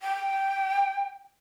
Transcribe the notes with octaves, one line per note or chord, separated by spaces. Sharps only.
G5